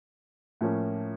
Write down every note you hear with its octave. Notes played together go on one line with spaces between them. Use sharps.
A2 F3 A#3 C#4